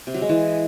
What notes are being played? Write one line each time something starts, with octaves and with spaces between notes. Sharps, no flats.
C3
F#3
G#3
E3